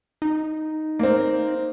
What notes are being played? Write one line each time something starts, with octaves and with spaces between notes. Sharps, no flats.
D#4
A#3 C4